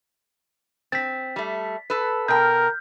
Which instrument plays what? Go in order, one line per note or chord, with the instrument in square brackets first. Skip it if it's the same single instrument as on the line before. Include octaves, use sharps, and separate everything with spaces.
[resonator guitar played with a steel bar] C4 [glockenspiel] A6 B6
[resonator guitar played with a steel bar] G3 A3
A4 B4
[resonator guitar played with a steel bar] B2 G5 [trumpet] A#4 [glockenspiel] F6 G6